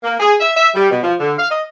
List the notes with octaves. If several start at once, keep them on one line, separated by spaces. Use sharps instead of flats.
A#3
G#4
E5
E5
G3
B2
F3
D3
F5
D#5